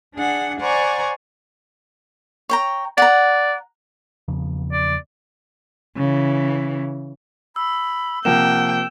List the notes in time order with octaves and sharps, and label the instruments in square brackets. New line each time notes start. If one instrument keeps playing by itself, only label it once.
[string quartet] D4 G#4 F#5
C5 D5 F#5 G#5 A#5 C#6
[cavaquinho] C#5 G5 A#5
[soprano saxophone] D5 [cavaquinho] F#5 A#5
[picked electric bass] E2 C#3 F3
[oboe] D5
[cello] C#3 E3
[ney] B5 [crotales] E6
[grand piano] C3 F3 A#3 [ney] F#5 [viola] G5 [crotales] E7